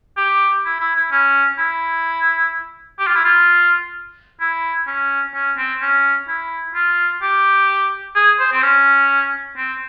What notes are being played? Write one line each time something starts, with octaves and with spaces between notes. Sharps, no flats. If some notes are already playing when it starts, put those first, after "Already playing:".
G4
E4
E4
E4
C#4
E4
G4
F4
E4
F4
E4
C#4
C#4
C4
C#4
E4
F4
G4
G#4
C5
C4
C#4
C4